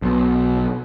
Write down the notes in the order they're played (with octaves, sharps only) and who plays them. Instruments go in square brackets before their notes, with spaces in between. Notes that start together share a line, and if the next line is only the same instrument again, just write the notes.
[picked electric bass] B1 B2